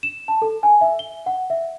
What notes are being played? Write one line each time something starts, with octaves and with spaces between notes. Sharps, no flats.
E7
A5
A4
G#5
E5
G7
F#5
E5